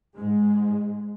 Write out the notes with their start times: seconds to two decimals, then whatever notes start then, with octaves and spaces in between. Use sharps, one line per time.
0.14 G#2 G#3